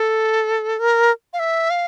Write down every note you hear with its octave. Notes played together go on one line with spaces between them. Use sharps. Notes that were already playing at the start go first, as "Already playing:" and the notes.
Already playing: A4
A#4
F5
E5
F5